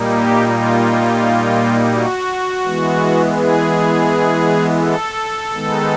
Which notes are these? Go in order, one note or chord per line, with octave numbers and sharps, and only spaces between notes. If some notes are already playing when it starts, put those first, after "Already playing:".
Already playing: A#2 G3 A#3 D#4
G4
F4
F#4
E3 G#3 B3
G#4
A4
D#3 G#3 B3 D#4